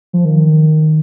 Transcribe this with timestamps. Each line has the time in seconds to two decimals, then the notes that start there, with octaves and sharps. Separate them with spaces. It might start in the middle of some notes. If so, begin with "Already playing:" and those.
0.13 F3
0.25 D#3